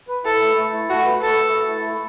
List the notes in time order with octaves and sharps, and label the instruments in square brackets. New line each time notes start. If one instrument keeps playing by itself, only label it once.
[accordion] B4
[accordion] E4 [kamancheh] A4
[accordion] A3
A3
E4
[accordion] A3 [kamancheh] F#4
[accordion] B4
[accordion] A3 [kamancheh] A4
[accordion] A3
A3
E4
A3